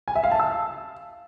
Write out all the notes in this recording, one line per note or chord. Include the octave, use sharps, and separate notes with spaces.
G#5
E5
F5
A5
E6